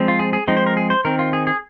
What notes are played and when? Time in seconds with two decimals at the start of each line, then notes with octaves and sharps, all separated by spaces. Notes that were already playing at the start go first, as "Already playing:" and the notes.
Already playing: F3 G#3 C4
0.08 F4
0.19 G#4
0.33 G#4
0.48 F3 G#3 C4 D#4
0.57 C5
0.67 A#4
0.77 G#4
0.90 C5
1.05 D#3 C4 A#4
1.19 F4
1.33 G#4
1.47 G#4